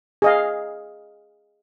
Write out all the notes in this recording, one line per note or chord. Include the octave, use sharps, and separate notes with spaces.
G#4 D#5 F5